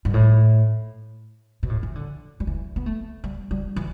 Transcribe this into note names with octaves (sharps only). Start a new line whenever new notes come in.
G2
A2
B2
A2
E3
D3
G3
E3
B3
A3
G3
G3
E3